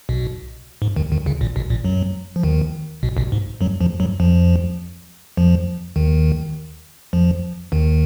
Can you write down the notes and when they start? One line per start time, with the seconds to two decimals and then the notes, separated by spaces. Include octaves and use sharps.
0.09 B1 B2
0.82 G#2
0.96 D#2 D#3
1.12 D#2 D#3
1.26 C#2 C#3
1.41 A#1 A#2
1.56 B1 B2
1.70 A#1 A#2
1.85 F#2 F#3
2.36 F3
2.43 D#2 D#3
3.03 B1 B2
3.17 B1 B2
3.32 G#2
3.61 F#2 F#3
3.81 F2 F3
4.00 F#2 F#3
4.20 F2 F3
5.37 F2 F3
5.96 D#2 D#3
7.13 F2 F3
7.72 D#2 D#3